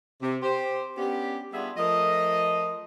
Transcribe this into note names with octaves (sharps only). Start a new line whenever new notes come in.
C3
G4 C5
B3 C#4 D4 G4
G3 B3 D4 F4 G#4 E5
F3 A3 A#4 D#5